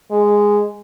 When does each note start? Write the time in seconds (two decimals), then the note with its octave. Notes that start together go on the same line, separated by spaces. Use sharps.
0.12 G#3